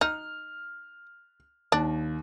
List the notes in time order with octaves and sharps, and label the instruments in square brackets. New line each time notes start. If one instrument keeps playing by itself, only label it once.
[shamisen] D#4 [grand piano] F6
[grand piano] D#2 [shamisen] D4